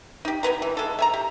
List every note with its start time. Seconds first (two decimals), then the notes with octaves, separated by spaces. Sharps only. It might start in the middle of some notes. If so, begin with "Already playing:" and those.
0.25 D#4 G4
0.43 F#3 E4 B4 A#5
0.62 E3
0.77 G#3 A4
0.99 E5 G#5 A#5
1.14 G4